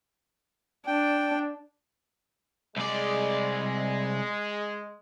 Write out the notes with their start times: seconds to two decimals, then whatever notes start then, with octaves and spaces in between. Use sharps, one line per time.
0.87 D4 G5
2.77 C2 G#3 D5